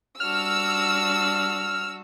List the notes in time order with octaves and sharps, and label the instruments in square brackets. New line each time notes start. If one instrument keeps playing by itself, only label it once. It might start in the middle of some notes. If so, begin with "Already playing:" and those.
[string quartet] G3 D4 F#4 [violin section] E6 [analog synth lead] F6